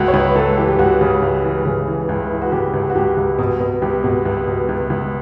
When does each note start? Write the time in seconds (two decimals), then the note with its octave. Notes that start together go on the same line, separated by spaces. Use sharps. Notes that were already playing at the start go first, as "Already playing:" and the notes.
Already playing: C#2 F#4
0.08 C#5
0.14 C#2 B4
0.36 C#2 A4
0.57 E3 G4
0.68 G4
0.79 C#2 F#4
1.01 C#3
1.22 C#2
1.44 E3
1.66 C#3
1.87 E3
2.09 C#2
2.30 E3
2.42 F#4
2.52 C#3 G4
2.74 C#2
2.90 F#4
2.95 C#2 G4
3.17 C#2
3.39 B2
3.60 B2
3.82 C#2 G4
4.04 B2
4.26 C#2
4.47 B2
4.69 C#2
4.90 C#2